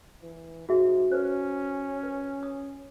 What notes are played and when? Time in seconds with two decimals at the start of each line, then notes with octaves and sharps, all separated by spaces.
0.23 E3
0.69 G#2 F#4 G#4 E5
1.12 C#4 B4 C5
2.03 B4
2.43 D#6